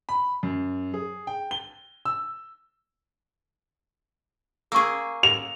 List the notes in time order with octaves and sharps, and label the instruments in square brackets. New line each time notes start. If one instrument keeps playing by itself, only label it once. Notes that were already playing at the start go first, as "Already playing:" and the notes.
[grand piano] B5
F#2
G#4
G5
G7
E6
[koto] A#3 G#4 [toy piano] C#6 E6
[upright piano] F7